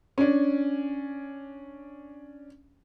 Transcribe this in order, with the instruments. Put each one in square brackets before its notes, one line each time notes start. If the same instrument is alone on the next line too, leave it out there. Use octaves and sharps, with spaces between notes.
[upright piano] C#4 D4